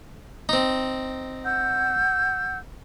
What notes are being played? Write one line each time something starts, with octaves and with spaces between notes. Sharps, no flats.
C4 D#4
F#5 E6 G6